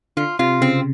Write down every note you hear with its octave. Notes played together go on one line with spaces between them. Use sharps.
D3 F4
C3 F4
C#3 C4